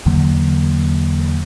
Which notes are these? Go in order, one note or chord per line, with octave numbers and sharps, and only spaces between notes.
E2 D3 F#3 A#3